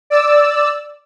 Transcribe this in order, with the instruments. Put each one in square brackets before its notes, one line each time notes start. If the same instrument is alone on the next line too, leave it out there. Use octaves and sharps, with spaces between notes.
[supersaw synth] D5 E6